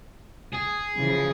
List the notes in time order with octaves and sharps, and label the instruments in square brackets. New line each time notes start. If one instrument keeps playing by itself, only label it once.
[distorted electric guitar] G#4
[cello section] C#3 E3 F3